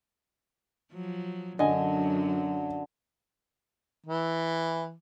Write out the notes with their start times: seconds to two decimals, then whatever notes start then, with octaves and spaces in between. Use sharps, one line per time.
0.93 F3 F#3
1.59 F#2 D3 F#3 D#5 G#5
4.06 E3